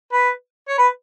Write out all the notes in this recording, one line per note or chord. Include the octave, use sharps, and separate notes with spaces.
B4
C#5
B4